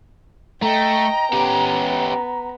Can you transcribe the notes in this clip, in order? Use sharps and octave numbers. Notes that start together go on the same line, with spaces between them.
A3 D#5 G5 A#5
B3 C#4 G4